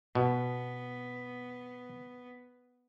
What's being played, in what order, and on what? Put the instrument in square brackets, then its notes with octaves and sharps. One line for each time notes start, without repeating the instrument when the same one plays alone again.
[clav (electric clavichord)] B2 [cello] B3